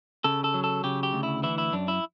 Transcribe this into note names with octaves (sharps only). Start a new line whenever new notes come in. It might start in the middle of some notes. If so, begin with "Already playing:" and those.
C#3 A4
A4
F#3
A4
C#3 G4
G4
D2
E4
E3 E4
E4
F#2 D4
E4